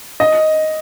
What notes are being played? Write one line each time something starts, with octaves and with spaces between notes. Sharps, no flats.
D#5